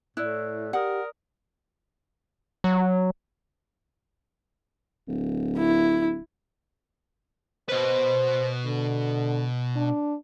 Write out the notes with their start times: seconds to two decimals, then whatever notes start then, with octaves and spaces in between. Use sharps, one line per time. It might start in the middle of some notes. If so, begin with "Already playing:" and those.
0.17 A2 E4 D5 E6 F#6
0.73 G4 A#4 D5 F#5 D#6
2.64 F#3
5.08 D1
5.58 E4
7.69 B2 B4 C5
8.66 D3
9.76 D4